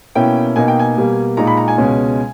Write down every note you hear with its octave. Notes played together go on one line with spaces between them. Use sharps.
B2 A#3 C#4 E4 G5
B2 A#3 D#4 G#5
G5
G#5
B2 G3 A#3
A#2 G#3 D#4 A#5
B5
A#5
G#5
C#2 B2 G#3 C#4